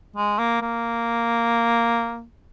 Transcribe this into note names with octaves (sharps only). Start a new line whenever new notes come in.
G#3
A#3
A#3